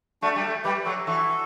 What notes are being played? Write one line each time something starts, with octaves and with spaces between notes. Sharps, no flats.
A3 D4 F#4
G3
A3
G3 G4 B4
F#3 F#4 A4
E3 F#4 A4